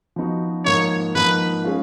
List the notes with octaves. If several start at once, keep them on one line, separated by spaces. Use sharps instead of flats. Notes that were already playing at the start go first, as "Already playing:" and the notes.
F3 B3 D#4 F#4
G#2 F3 A#3 D#4 C#5
G#2 F3 A#3 D#4 B4
G#3 C#4 F4